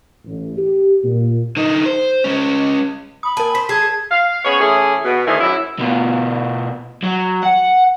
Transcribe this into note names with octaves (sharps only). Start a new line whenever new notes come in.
A1
G4
A#2
D3 D#4
C5
G#3 C#4
B5 D#6
A#3 A#4 G#5 A5
C5 B6
F#3 G#4 A4 A5 G#6 C7
F5
B3 C#4 G#4 C#5
E3 A3 C#4 G#4
B2
D3 D#3 A3 C4 E4 G#4
F#2 E4
B2 F4
F#3
F#5